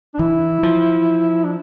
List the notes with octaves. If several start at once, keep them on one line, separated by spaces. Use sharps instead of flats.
D4
E3 E4
F3
D4